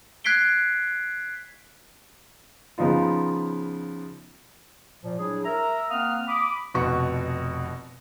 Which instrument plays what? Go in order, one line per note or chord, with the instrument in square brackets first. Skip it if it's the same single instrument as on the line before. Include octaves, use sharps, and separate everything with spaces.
[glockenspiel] F#6 G#6 B6 C7 D7 G7
[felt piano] C#3 F3 B3 D#4 F4
[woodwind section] A#2 F3
F#3 G3 D4 E4 G#4
A#4 E5 A#5
A#3 C4 F5 F#5 D#6 F6
B5 D6 D#6
[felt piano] F1 B2 F#4 C#6 C#7